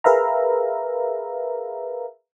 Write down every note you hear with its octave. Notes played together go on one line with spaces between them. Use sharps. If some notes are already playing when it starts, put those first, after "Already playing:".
G#4 A#4 B4 E5 F5 A#5